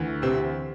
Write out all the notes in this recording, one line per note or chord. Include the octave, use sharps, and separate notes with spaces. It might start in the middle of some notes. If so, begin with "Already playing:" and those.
Already playing: D2 E3
C3 C4